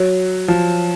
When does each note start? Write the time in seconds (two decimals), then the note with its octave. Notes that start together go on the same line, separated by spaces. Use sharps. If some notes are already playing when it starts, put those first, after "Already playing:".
Already playing: F#3
0.48 F3